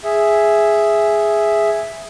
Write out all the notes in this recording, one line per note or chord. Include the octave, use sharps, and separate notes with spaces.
G#4 E5